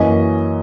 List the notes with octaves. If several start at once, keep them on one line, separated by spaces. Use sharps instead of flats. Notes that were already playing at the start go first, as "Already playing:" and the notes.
Already playing: F#2 E3 A#3 C#4 D#5